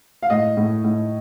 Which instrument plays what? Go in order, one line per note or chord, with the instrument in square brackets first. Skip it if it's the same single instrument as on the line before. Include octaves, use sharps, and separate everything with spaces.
[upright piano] F5
A2 D#5
A2
A2